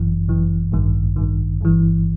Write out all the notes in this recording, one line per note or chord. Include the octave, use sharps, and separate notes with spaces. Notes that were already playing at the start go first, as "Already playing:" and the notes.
Already playing: G1 F#2 E3
G1 F#2 E3
A1 G2 D#3
A1 G2 D#3
G1 G2 E3